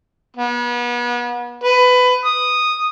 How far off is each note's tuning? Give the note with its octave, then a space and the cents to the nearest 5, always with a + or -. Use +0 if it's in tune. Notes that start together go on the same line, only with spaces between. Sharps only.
B3 -35
B4 +20
D#6 -5